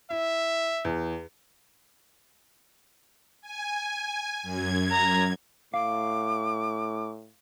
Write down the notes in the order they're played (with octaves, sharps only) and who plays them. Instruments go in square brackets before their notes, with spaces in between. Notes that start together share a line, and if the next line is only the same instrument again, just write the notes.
[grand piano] E4 [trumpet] E5
[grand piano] E2
[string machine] G#5
F#2 G#6
[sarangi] A#5
[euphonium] A2 [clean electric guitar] F5 [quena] D6